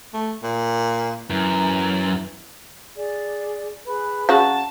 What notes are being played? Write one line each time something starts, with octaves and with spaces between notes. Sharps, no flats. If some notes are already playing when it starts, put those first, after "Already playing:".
A3
A#2
F#2 E3
G#4 D5
G#4 B4 B5
C#3 F#3 F#4 A5